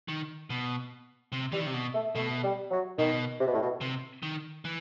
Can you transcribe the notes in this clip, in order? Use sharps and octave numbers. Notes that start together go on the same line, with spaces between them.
D#3
B2
C3
E3 G3
D#3
C3
B2
A3
B2 A3
G3
F#3
B2 D#3
C3
B2
A2
B2
C3
D#3
E3